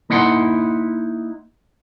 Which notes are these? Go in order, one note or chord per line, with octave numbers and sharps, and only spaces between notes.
A#3 D#4 E4 F#5 C6